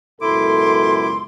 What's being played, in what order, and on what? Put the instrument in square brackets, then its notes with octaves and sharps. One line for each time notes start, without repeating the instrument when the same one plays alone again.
[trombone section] C#2 F#2 B2 [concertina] E4 D6 [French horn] A4 [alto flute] C6